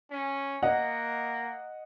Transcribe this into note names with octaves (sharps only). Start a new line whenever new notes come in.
C#4
A#3 D#5 F#5